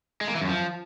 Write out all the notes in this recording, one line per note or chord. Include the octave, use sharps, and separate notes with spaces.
G#3
A#3
E3
F#2
F3